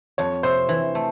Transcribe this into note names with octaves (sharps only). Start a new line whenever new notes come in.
F2 C#5
C3 C5
E3
A3